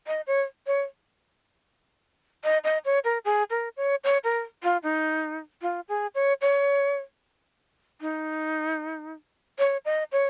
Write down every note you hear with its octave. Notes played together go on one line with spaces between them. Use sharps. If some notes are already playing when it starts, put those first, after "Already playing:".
D#5
C#5
C#5
D#5
D#5
C#5
A#4
G#4
A#4
C#5
C#5
A#4
F4
D#4
F4
G#4
C#5
C#5
D#4
C#5
D#5
C#5